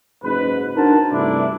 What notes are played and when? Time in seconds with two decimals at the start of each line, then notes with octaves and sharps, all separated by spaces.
0.23 F#1 G#2 B4
0.76 D4 D#4 F#4 A#4 C5 A5
1.12 G2 C3 E3 A3 D4 E4